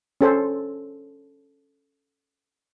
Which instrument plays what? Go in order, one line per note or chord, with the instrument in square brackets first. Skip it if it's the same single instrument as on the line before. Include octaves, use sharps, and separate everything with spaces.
[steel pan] C#4 A4 C5